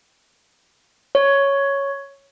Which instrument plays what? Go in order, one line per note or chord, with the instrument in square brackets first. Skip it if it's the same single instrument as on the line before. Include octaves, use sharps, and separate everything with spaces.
[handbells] C#5